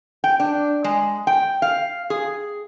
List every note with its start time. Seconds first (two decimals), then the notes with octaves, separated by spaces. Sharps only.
0.24 G5
0.40 D4
0.84 G#3
1.27 G5
1.62 F5
2.10 G#4